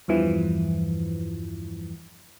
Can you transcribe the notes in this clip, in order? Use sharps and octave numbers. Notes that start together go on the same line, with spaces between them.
E2 G2 E3 F3